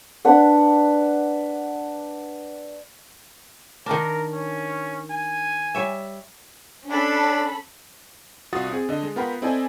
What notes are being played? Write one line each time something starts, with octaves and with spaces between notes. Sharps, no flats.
D4 B4 F#5
D#3 D4 A#4
C#4
G#5
G3 C#5 E5
C#4 D4 A4 B5
C2 F4 F#4 F#5 D#6 A6
C4 G#4
D3 D#5
G#3
B3 F4 A#4 F#5 G5 B5
C4 E4 A4 D5 D#5 G#5